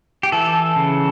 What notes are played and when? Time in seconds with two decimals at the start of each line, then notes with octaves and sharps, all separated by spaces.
0.23 G4
0.32 E3 A4
0.76 C#3